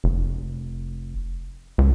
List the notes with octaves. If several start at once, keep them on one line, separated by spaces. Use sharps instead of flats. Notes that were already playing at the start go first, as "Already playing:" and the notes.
F1
C#2